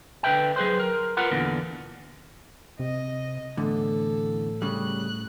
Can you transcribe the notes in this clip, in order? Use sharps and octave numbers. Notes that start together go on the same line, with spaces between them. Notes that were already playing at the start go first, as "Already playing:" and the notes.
D3 B4 E5 G5
F#3 G#4 B4 C5
A#4
F4 A#4 B4 F#5
E2 A#2 D3 E3
C3 D#5
E2 A2 D3 A4
C#3 G3 F#6